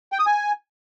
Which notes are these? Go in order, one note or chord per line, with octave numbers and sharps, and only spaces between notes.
G5
D#6
G#5